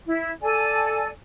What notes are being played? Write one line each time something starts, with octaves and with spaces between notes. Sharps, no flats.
E4
A4 D5 G#5